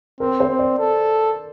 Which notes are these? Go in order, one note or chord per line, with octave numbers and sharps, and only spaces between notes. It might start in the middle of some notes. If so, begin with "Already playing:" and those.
C4 A#4
C5
C4
D5
A4